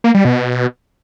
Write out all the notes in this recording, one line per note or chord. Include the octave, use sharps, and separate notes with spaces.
A#3
G3
B2